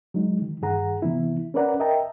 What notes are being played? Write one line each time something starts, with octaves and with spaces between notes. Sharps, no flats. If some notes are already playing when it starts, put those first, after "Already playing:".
F#3 G#3 D#4
D#3
G2 D#3 G#4 F#5 A#5
C3 E3 B3 E4
C#4 A#4 B4 D5 F#5 A#5
A#4 D#5 E5 G5 A5 A#5